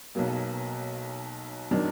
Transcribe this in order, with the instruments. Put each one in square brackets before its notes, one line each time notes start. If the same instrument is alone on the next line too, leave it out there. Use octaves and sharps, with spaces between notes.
[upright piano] B1 B2 F#3 A#3
D#3 F#3 D4